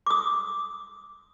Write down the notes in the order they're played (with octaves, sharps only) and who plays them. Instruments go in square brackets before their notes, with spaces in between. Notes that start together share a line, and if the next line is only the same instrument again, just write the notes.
[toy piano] D6 D#6